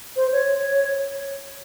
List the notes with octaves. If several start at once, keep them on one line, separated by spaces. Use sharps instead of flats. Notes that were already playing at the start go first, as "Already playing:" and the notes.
C5
C#5